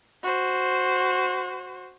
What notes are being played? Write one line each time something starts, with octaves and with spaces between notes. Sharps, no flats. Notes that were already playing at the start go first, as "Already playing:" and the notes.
F#4 C5